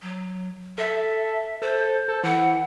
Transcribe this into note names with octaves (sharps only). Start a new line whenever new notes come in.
F#3
A4 E5
A4 C5
A4
E3 F#5